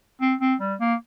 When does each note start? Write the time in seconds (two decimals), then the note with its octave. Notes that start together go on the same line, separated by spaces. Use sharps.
0.21 C4
0.41 C4
0.61 G3
0.81 A#3